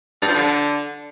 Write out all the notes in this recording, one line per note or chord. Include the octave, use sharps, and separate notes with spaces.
G2
F3
D3